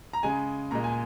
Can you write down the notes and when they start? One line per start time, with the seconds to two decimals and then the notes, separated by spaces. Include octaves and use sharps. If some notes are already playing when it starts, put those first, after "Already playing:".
0.13 A#5
0.23 C#3 G#3 G#5
0.71 A#2 G#3 A#5
0.84 G#5